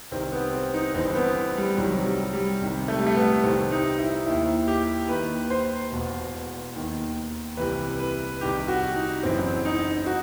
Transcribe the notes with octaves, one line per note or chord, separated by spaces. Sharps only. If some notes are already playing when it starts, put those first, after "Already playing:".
C2 C3 D#3 C4
B3
C4
D#4
G1 G2 E3 C4
B3
G3
C2 C3 D#3 F#3
G3
G3
C2 C3 D#3
A3
G3
A3
B3
C2 C3 D#3 C4
D#4
E4
D#2 D#3 E4
G4
D#2 D#3 B4
C5
E1 E2 B2
D#2 D#3
C2 C3 E3 B4
B4
C2 C3 D#3 G4
F#4
D#4
F#1 F#2 E3 C4
D#4
F#4